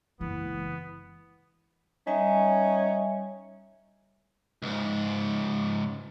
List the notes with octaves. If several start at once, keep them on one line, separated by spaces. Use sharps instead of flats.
F#1 E3 G#3 B3
G3 C#4 D#4 E5 G#5
C#2 G#2